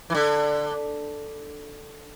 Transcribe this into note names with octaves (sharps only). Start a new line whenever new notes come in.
E3
D3